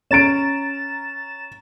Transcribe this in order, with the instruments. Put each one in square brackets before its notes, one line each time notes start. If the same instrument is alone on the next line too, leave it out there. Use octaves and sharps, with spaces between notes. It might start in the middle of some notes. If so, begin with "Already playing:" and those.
[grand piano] C#4 D7 [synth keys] A#5 A6 E7